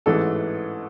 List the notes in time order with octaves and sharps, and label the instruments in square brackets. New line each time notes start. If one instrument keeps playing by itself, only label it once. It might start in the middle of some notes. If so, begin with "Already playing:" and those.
[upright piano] A1 G#2 E3 A4